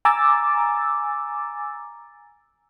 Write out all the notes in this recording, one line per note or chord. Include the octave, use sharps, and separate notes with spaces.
G#5 A#5 D6 E6 A6